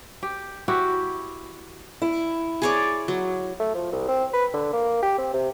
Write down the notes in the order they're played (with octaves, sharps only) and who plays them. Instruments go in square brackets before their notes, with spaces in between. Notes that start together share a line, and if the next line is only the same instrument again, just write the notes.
[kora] G4
E4 F#4 G4
[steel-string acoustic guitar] E4
[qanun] G#4 C#5 D5
F#3
[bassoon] A3
F3
C2
C4
B4
D3
A#3
G4
C4
C3